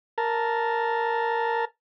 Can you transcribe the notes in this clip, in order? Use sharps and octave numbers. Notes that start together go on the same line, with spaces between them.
A#4 A5